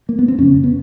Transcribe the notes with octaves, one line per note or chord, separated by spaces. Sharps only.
A#3
B3
C4
F2 C#3 C#4
B3